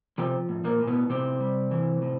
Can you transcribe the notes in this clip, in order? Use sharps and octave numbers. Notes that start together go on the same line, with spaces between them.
C3 F3 C4
A2
A#2 A#3
A2
B2 B3
A2 C3 C4
G3
E3
A2